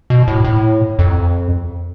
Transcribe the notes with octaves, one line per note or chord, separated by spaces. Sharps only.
B2
A2
A2
F2